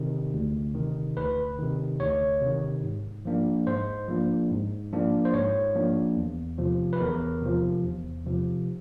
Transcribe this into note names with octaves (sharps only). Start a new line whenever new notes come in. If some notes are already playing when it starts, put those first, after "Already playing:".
Already playing: C3 D#3
D2
C3 D#3
D2 B4
C3 D#3
D2 C#5
C3 D#3
G#2
F3 A#3 D4
G#2 C5
F3 A#3 D4
G#2
F3 A#3 D4
C5
G#2 C#5
F3 A#3 D4
E2
C3 F3
B4
E2 A#4
C3 F3
E2
C3 F3